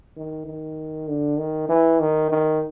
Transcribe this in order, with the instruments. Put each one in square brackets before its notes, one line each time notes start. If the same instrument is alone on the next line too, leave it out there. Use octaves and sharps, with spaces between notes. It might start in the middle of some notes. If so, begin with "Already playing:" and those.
[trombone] D#3
D#3
D3
D#3
E3
D#3
D#3